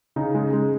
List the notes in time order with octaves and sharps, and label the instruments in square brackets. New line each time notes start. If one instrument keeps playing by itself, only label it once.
[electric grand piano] C#3 D#4
G#3
G#3